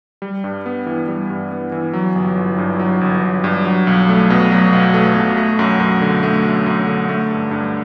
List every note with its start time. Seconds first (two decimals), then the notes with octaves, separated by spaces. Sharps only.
0.22 G3
0.44 G2
0.66 B3
0.86 E3
1.08 G3
1.30 G2
1.52 B3
1.72 E3
1.93 F#3
2.16 G1
2.37 G1
2.58 G2
2.80 F#3
3.01 G1
3.23 G1
3.44 G2
3.65 F#3
3.87 B1
4.09 A3
4.30 B2
4.51 F#3
4.73 B1
4.94 A3
5.15 B2
5.37 A3
5.59 F#2
5.80 F#2
6.01 D3
6.23 A3
6.45 F#2
6.66 F#2
6.87 D3
7.09 A3
7.31 G2
7.51 G2